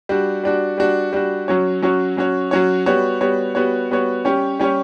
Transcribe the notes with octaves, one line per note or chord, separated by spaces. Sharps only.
G3 D4 F#4
G3 D4 F#4
G3 D4 F#4
G3 D4 F#4
F#3 C#4 F#4 C#5
F#3 C#4 F#4 C#5
F#3 C#4 F#4 C#5
F#3 C#4 F#4 C#5
G3 B3 F#4 C#5
G3 B3 F#4 C#5
G3 B3 F#4 C#5
G3 B3 F#4 C#5
G3 C#4 G4 C#5
G3 C#4 G4 C#5